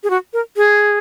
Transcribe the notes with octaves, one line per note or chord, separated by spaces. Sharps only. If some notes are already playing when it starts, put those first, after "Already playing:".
G#4
F#4
A#4
G#4